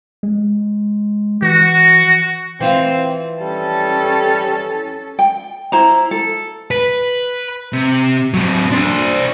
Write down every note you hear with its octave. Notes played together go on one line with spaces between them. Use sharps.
G#3
E3 F#4
E3 C4 F4
G3 C#4 A4
G5
E4 C5 A#5
A4
B4
C3
F#3 C4
D4 C5